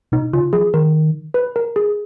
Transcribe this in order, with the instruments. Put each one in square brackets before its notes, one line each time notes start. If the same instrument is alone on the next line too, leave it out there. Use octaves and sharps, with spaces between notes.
[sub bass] B2 [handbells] D#4
[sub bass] C#3 [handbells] F4
[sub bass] F3 [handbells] G#4
[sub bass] D#3 [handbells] A#4
[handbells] B4
A#4
G#4